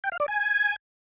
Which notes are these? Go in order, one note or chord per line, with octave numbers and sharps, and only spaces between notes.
G5
F5
D5
G#5